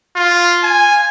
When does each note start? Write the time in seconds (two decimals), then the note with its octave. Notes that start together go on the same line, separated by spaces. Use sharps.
0.16 F4
0.64 G#5